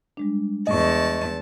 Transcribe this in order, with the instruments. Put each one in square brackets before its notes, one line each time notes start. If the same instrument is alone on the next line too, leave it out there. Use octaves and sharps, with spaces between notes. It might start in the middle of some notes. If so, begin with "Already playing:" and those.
[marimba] G3 G#3 D4
[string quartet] E2 A5 [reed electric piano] D#5 C#6